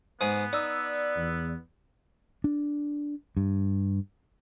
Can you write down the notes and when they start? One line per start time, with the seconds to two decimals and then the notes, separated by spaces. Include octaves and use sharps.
0.21 G#2 B3 D#6
0.53 D#4 D5 E6
1.17 E2
2.44 D4
3.37 G2